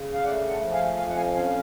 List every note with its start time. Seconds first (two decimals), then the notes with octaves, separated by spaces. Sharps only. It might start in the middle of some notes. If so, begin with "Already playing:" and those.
Already playing: C#3
0.14 F5
0.24 A3 D5 F#5
0.48 F#5 A5
0.61 F3
0.73 F5 G#5
0.98 F2 F5 G#5
1.08 F#5
1.16 F5 G#5
1.35 C#4 F5 G#5
1.46 F5